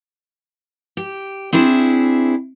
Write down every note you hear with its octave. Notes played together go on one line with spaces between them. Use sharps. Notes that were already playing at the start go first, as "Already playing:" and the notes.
G4
C4 D4 E4 G#4